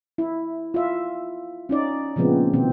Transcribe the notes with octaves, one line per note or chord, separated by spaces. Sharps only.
E4
F4 E5
C#4 D#4 D5
A#2 C#3 F3 G#3 B3 C4
B2 D#3 C4